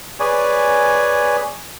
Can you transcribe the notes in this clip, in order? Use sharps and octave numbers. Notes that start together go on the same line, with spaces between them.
G#4 B4 C#5 D5 G#5